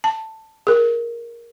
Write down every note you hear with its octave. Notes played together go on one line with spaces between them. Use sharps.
A5
G#4 A#4